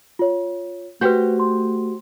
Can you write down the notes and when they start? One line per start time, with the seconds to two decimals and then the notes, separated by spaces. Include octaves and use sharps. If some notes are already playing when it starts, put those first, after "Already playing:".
0.19 F4 C#5
1.01 A3 F#4 G4 B4 C5 G5 G6
1.40 C6